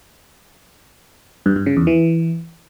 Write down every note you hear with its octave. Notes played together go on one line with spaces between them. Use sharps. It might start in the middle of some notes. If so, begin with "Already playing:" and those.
G2
G2
C#3
E2
E3